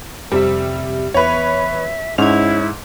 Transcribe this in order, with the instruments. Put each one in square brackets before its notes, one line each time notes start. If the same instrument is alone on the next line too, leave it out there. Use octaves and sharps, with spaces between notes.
[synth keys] F2 C3 E5 [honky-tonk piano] G3
[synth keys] E2 [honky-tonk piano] B4 C#5 [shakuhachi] E5
[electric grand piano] G#2 [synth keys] C#4 G#6 [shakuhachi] E4 [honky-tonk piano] F7